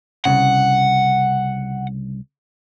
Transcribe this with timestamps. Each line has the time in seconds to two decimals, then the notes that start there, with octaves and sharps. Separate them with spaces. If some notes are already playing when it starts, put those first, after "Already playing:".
0.25 C2 G2 C#3 F#5